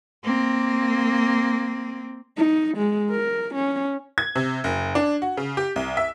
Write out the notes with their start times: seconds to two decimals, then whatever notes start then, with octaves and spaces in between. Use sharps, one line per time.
0.24 A#3 C4
2.37 D#4
2.77 G#3
3.11 A#4
3.55 C#4
4.18 G#6
4.35 C3
4.64 F#1
4.95 D4
5.22 F#4
5.37 C#3
5.57 G4
5.76 C2
5.97 E5